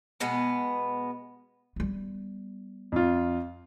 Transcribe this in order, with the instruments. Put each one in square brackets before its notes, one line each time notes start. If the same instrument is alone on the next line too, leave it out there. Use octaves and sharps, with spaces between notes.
[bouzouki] B2 G#3 B3
[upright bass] G3 B3
[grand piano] F2 F4